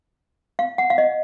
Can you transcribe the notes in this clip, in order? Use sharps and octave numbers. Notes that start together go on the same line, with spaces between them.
F5
F#5
F5
D#5